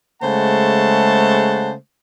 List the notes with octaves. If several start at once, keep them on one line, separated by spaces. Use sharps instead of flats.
C#3 G#3 A3 C5 F#5 A5